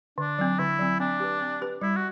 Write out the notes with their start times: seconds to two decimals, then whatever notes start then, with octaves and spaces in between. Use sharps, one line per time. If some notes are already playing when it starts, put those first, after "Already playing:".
0.18 D3 D4
0.38 F#3 C4
0.59 D3 E4
0.79 F#3 C4
1.00 C4 D4
1.20 G4 B4
1.41 C4
1.61 G4 B4
1.81 G3 E4
1.96 F#4